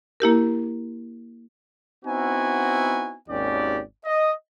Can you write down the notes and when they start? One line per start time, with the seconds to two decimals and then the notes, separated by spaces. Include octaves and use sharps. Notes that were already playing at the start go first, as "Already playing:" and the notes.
0.20 A#3 E4 G4 A#4
2.05 B3 C4 D#4 E4 F#4 G#5
3.29 G#1 D#2 C#4 G4 D5
4.05 D#5